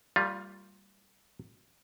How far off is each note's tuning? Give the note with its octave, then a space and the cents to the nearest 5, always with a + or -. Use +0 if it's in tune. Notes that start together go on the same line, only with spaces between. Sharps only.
G3 +0 A#3 -40 F4 +10